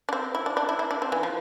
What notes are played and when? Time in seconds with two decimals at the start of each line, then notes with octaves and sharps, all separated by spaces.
0.09 D4
0.13 C4
0.35 E4
0.46 D4
0.57 D4
0.69 E4
0.79 E4
0.91 D4
1.02 C4
1.12 E3
1.23 F3